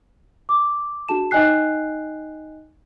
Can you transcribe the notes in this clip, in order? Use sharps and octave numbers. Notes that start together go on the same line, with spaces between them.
D6
D4 F#4 G#4 A5 E7
D#4 D#5 G5 G#5 F#6 C7